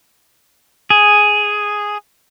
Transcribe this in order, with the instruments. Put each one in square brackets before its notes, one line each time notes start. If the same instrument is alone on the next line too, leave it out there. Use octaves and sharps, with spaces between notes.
[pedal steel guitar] G#4